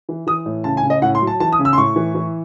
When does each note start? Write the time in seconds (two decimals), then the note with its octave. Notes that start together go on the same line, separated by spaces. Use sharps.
0.09 E3
0.27 E3 D#6
0.46 A2
0.64 C#3 A5
0.77 G#5
0.83 C#3
0.90 D#5
1.02 A2 F#5
1.15 C6
1.21 F#3
1.27 A5
1.40 E3 A5
1.53 D#6
1.59 C#3
1.65 E6
1.73 C6
1.78 A2 C#6
1.96 E3
2.15 E3